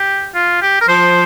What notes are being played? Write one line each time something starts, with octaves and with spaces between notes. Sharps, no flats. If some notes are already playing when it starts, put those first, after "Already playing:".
Already playing: G4
F4
G4
A#4
F3 C5